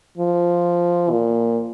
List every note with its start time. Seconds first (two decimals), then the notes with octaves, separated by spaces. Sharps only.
0.17 F3
1.12 A#2